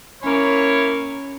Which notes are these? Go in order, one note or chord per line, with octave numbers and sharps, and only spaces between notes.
A#3 C#4 E4 C#5 B5